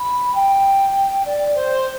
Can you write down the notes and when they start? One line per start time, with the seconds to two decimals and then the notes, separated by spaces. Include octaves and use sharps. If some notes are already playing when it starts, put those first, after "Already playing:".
Already playing: B5
0.34 G5
1.25 D5
1.54 C5